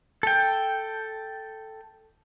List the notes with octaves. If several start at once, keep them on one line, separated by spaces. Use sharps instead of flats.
A4 G5